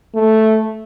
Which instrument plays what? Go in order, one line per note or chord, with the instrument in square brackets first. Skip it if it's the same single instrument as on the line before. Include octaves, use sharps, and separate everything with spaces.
[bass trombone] A3